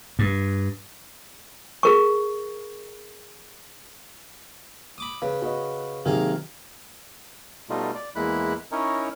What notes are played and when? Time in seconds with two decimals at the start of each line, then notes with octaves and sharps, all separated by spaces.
0.19 G2
1.83 G#4 A#4 C#6
4.98 B5 D6 D#6
5.22 C#3 B4
5.42 F#4 B4 D#5
6.05 C3 D#3 F#3 A#3 G#4 F5
7.70 B2 G3 A3 D#4 F4
7.95 D5
8.16 E2 G#3 A#3 E4 B5 F#6
8.72 C#4 D#4 E4 A#4 C#5